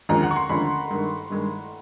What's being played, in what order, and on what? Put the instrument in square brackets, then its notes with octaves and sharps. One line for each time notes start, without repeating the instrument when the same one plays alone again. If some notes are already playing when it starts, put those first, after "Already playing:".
[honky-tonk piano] D#2 D3 F3 G#3 C#4 [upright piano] A#5
[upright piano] F#5
C#6
C6
[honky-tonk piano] D#2 D3 F3 G#3 C#4 [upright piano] B5
[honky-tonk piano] G2 D#3 G#3
G2 D#3 G#3